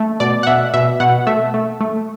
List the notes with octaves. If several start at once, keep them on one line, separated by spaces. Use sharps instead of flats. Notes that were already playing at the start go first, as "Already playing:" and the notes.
Already playing: A3
B2 D5
F#5
B2 E5
B2 E5
B2 F#5
A3 E5
A3
A3